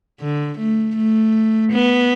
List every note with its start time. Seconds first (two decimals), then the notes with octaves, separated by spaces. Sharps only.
0.21 D3
0.59 A3
0.97 A3
1.72 B3